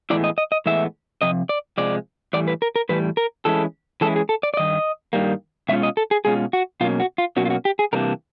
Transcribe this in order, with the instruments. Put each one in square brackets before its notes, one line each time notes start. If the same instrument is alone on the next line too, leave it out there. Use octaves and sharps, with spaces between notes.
[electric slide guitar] A2 E3 G#3 B3 E4 D5
D#5
D#5
D#5
A2 E3 G#3 B3 E4 E5
C3 F3 D#5
D5
C3 F3 G#3 D5
A2 E3 G3 D5
B4
A#4
A#4
A2 E3 G3 B4
A#4
E3 G#3 C#4 E4 A4
E3 G#3 C#4 E4 A4
G#4
A4
D5
D5
G2 D#3 D#5
G2 D#3 G3 A#3
B2 G#3 C#4 F4 E5
D#5
A4
G#4
B2 G#3 C#4 F4 G#4
F#4
B2 F#3 A#3 C#4 F4
F#4
F4
B2 F#3 A#3 C#4 F#4
F4
F#4
G4
G#4
C3 E3 G3 A#3 D4 A#4